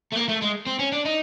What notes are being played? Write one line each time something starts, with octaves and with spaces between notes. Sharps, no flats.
A3
A#3
A3
G#3
C4
C#4
D4
D#4